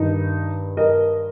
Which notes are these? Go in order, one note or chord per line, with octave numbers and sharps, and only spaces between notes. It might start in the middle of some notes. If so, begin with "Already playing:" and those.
Already playing: G2 D#3 D#4
A#4 D#5